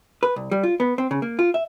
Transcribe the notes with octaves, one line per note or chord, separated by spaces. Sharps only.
B4
C2
G3
F4
B3
C4
C#3
A#3
F4
E5